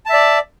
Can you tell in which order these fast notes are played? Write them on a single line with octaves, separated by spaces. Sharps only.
A5 E5 D5